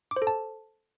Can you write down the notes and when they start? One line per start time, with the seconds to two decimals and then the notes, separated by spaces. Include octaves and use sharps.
0.11 D6
0.16 C5
0.22 A4
0.27 A5